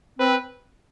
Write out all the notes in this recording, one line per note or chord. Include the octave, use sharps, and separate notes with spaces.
C4 B4